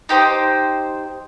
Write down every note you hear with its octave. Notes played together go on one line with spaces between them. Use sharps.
D#4 G4 C5 G5